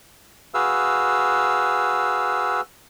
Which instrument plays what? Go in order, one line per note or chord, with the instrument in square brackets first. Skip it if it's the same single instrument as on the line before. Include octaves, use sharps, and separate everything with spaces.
[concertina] F#4 G#4 B4 F5 E6